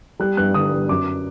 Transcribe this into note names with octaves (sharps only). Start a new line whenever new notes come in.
G3 F#6
G2 F#6
D3 D#6
G2
F#2 D6